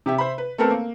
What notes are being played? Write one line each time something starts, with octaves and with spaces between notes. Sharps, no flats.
C3 G4 E5
C5 E5 B5
B4
A3 B3 C4 A4 A#4 A5
A#3